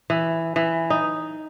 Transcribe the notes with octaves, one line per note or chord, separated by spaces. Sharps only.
E3
E3
D#4